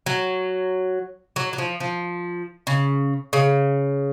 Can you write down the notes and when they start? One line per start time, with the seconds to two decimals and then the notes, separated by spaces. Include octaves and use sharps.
0.06 F#3
1.36 F#3
1.53 F#3
1.58 F3
1.80 F3
2.67 C#3
3.33 C#3